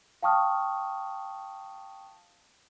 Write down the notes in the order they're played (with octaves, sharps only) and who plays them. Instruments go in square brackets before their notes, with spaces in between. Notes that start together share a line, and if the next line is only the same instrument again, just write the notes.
[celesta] F5 G5 A5 C#6 D#6 F6